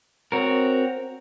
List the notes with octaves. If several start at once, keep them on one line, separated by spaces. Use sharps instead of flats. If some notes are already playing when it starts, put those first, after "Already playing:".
C4 F#4 A#4 C#5